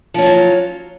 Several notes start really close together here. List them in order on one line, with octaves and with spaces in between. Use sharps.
F3 C#4 F4 F#3